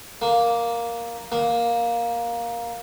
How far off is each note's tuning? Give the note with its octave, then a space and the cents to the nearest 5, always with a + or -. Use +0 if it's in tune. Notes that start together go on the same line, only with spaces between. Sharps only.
A#3 +5
A#3 +10